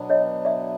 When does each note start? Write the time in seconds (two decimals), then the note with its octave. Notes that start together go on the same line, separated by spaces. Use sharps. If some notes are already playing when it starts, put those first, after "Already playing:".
Already playing: B2 F#3 B3 D4
0.10 C#5 D#5
0.45 D5 E5